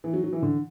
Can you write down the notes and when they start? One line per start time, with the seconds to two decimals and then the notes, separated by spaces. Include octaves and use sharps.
0.04 E3
0.14 F#3
0.24 F#3
0.33 E3
0.42 D3